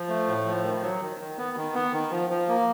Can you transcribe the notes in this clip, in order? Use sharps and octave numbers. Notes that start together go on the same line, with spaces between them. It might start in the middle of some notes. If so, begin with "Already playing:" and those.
Already playing: F3
A3
A2
F3
D#3
F#3
D#3
D#3
B3
D#3
B3
D#3
F3
F3
A#3